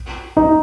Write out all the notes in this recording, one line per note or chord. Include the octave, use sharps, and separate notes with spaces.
D#4